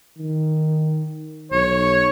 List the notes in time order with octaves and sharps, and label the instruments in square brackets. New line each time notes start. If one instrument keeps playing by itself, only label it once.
[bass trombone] D#3
[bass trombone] B1 [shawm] C#5